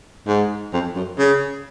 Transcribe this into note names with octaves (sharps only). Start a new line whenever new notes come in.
G#2
F2
F#2
C#3